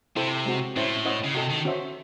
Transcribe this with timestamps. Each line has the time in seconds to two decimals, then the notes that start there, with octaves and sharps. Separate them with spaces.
0.16 C3 E4 A4 C5 E5
0.46 G#3 C4 F#4
0.76 A2 C#4 E4 C5 E5
1.05 C#4 E4 C5 D#5 F#5
1.24 C#3
1.35 C3 F#4 A4 D#5
1.50 D#3
1.65 C#4 F#4 C5 E5